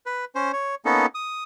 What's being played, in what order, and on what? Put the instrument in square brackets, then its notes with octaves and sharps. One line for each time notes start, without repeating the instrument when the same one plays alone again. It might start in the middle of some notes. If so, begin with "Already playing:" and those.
[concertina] B4
C#4 C5
C#5
A#3 B3 C#4 D#4 A4
D#6